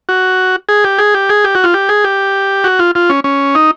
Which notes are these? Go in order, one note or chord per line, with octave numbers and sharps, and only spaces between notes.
F#4
G#4
G4
G#4
G4
G#4
G4
F#4
F4
G4
G#4
G4
F#4
F4
F4
C#4
C#4
D#4